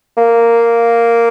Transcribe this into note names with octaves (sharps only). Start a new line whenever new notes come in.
A#3